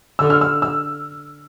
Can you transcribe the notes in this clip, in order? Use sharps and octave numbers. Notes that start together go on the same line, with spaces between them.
D3 E6
F6
E6
E6